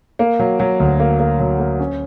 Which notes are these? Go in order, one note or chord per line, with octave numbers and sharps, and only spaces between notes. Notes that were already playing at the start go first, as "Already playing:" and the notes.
A#3
F#3
F#3
D2
A#3
A#3
F#3
A#3
C#4